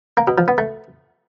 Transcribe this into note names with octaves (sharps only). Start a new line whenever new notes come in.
A#3
B2
F3
B3
A3